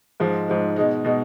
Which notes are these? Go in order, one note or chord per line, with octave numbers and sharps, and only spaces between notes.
G#2 F3 G#3
G#2 F3 G#3
B2 G#3 D#4
B2 G#3 D#4